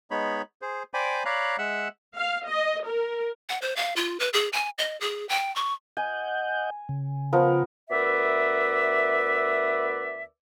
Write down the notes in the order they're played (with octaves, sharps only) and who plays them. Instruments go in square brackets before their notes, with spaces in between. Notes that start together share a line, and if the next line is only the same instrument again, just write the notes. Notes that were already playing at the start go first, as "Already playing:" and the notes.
[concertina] G#3 B3 D#4 C#5 B5
G#4 C5
C5 D5 G5 G#5 B5 D6
C#5 D5 F5 A#5 B5 F#6
G#3 E5 F#5 E6 F#6
[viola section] F5
D#5
A#4
[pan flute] F#5
C5
F5
F4
B4
G#4
G#5
D#5
G#4
G5
C#6
[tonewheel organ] D#5 F#5 G6 [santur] G#5
[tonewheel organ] C#3
[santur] F3 B3 A#4
[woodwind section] D2 B3 A#4 B4 D5 E5